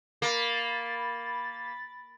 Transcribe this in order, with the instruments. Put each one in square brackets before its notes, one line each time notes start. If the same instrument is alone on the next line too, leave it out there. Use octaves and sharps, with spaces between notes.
[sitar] A#3 [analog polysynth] B5 A6